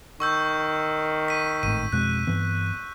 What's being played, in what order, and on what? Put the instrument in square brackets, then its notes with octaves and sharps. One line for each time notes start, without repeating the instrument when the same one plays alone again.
[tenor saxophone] D#3 [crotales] C#6 E6 G6
[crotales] B6 D#7
[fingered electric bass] G#1 A2 [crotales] D#7
[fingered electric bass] F2 B2 G#3 [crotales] F#6
[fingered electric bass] G2 E3 B3